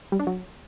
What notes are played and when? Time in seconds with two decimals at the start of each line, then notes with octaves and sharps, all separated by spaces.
0.12 G3
0.20 D4
0.27 F#3